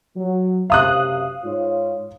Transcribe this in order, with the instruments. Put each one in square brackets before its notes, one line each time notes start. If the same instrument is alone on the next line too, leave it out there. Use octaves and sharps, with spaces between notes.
[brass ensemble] F#3
[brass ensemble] F#1 C3 [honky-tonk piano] F5 D#6 F#6
[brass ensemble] G#2 F4 C#5